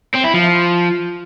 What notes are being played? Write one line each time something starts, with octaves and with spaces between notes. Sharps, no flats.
C4
E4
F3